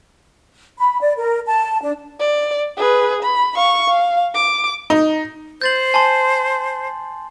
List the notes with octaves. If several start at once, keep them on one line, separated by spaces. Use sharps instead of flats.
B5
D5
A#4
A5
D4
D5
G#4 B4
B5
F5 C#6
F5
D6
D#4
C5 G6 A6 F#7
G#5 A5 C6